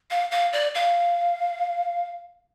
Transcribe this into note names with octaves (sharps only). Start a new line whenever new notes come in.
F5
F5
D5
F5